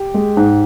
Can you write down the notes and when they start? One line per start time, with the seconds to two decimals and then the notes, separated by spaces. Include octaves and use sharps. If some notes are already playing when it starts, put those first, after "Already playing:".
Already playing: G4
0.14 G#3
0.37 G#2